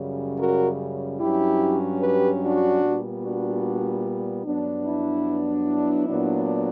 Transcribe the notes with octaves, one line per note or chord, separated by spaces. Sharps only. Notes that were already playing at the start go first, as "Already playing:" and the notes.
Already playing: F#2 C#3 G3
F#4 A#4
G2 F#3 C#4 E4 G4
G4 B4
D4 F#4
A#2 G3 B3
D4 F#4
G2 F#3 B3 D4
E4
E4
A#2 F#3 B3 D4